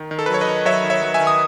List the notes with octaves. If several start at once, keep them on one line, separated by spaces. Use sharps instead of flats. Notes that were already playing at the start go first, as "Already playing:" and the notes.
Already playing: D#3
D#3
A4
B4
F#3 C#5
B4 D#5
D#3
F#3 C#5 E5
D#3
C#5 E5
F#3
E5 G#5
D#3
D#6